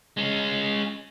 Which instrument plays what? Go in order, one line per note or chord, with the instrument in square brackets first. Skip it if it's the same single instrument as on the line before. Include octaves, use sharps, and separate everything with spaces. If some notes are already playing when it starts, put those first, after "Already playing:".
[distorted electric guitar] G#3 C#4